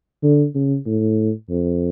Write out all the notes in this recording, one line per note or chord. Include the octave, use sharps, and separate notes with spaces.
D3
C#3
A2
F2